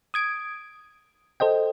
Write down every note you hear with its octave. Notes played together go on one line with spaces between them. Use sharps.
D#6 G#6 D7
A4 C5 D#5 G5